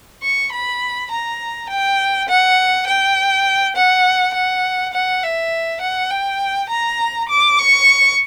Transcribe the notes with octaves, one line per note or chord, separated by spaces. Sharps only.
C#6
B5
A#5
G5
F#5
G5
F#5
F#5
F#5
E5
F#5
G5
A#5
D6
C#6